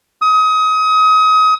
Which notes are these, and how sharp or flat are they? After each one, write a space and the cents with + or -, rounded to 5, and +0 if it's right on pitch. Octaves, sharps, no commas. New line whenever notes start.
D#6 +30